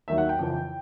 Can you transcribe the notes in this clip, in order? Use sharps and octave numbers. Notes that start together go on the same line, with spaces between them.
D#2 D#3 F#3 E5
F#5
G5
F2 C#3 E3